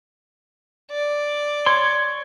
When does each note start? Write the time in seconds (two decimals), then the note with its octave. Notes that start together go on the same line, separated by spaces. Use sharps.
0.91 D5
1.66 C#5 C6